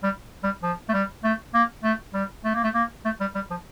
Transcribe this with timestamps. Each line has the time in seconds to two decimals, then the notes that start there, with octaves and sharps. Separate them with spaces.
0.03 G3
0.43 G3
0.63 F3
0.89 A3
0.93 G3
1.23 A3
1.54 A#3
1.83 A3
2.14 G3
2.44 A3
2.54 A#3
2.64 A3
2.74 A#3
3.05 A3
3.20 G3
3.35 G3
3.50 F3